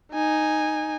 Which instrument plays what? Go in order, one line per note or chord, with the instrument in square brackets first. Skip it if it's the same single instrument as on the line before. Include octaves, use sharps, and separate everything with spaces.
[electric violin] D#4 G#5